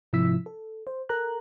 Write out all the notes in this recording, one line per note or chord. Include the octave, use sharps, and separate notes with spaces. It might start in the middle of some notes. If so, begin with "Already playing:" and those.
G#2 C3 F3 E4 E6 B6
A4
C5
A4 A#4 A#5 F#6